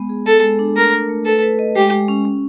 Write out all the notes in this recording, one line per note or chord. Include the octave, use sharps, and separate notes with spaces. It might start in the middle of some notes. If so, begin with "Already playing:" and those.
Already playing: G#3 B3
G#4
B3 A4
G#3
D4
A3 A#4
A#4
A3
A4 B4
B4
D#5
G#3 G4
G#3
C#4
C#4